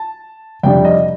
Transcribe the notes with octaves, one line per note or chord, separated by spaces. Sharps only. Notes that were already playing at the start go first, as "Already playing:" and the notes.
Already playing: A5
F2 C3 G3 D4 G5
D#5